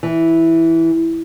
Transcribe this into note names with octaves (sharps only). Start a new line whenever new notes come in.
E3